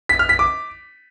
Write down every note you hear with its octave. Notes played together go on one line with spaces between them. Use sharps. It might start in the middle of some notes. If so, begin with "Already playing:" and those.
B6
F6
B6
D6